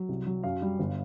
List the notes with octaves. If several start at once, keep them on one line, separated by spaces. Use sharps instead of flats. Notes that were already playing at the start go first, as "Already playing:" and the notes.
Already playing: F#3
C2
F#3
F#2 F5
G3
G1